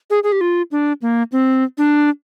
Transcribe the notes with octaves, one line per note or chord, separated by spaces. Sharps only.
G#4
G#4
G4
F4
D4
A#3
C4
D4